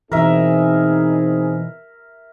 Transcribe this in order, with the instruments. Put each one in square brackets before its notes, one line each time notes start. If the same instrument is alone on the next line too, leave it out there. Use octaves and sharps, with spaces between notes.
[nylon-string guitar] B2 E3 [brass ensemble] C4 D#4 G#4 [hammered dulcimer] A#4 E5